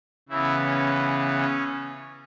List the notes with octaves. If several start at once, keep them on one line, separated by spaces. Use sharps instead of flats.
C#3 E3 B3 E4
C#4
C#4